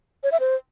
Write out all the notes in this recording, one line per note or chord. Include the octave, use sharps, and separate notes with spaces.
C#5
E5
C5